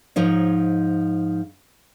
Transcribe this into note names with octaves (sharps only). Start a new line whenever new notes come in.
G#2 F3 D#4 C#5